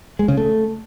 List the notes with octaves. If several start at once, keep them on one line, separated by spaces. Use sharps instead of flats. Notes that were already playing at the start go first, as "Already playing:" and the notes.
G#3
C#3
A3